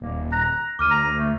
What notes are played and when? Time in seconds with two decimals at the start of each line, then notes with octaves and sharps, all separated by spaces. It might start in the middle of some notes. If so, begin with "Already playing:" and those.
0.01 D#1 A#3
0.32 A#5 F#6 A#6
0.79 D2 D6 F6 D#7
0.91 A#5
1.17 A3